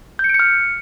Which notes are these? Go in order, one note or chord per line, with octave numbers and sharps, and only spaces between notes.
G6
C#7
D7
C#7
F6